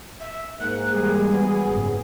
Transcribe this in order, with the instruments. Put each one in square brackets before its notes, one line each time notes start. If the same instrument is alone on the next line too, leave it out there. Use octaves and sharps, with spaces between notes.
[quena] E5
[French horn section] G#2 A#3 [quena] F#6
[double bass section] E3 G3 G#3 [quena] G#4
[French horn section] F#3 B3
[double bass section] F#1 G#2